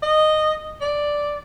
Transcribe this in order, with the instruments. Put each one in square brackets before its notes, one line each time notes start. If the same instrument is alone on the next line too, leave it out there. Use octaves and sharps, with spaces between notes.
[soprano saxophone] D#5
D5